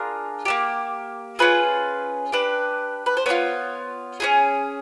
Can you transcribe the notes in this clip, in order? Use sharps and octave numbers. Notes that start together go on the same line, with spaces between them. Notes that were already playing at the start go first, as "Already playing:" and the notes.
Already playing: D4 F4 G#4 A#4
A#3 D4 G4
C#4 F4 G#4 B4
D4 G4 B4
B4
C5
B3 D4 F4 C#5
C#4 F4 G#4